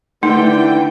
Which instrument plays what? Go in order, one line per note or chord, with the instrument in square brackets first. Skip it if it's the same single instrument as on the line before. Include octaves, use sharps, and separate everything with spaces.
[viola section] D3 E3 G5 [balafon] A3 D#4